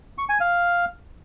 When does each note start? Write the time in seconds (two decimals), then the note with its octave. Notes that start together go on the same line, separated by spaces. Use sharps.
0.18 C#6
0.29 G#5
0.40 F5